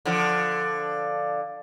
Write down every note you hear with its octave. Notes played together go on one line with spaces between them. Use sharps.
D3 F3